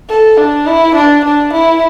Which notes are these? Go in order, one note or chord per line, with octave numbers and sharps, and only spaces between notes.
A4
D4
E4
D4
D4
E4